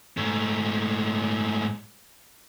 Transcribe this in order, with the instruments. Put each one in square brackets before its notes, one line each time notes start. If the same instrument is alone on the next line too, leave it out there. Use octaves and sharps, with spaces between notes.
[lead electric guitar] G#2 A3